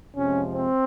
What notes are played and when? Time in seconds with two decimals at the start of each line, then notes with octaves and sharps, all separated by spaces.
0.16 F2 C3 F3 G#3 C#4
0.54 C4